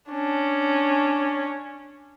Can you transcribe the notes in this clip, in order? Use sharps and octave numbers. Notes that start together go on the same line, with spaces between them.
C#4 D4